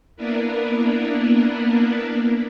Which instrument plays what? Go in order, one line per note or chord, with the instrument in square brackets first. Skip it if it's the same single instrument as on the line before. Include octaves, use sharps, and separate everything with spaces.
[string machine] A#3 B3 D4 E4 A#4 B4